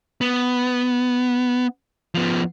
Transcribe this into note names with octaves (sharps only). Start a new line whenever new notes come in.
B3
F3 B3